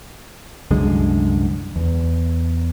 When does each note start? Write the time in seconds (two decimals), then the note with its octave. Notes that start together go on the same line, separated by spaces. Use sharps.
0.71 C2 F#2 D3 G#3
1.76 E2